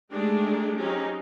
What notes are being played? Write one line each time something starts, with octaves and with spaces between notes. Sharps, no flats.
G#3 A3 D4 D#4 G4 G#4
F#3 C4 C#4 D#4 G4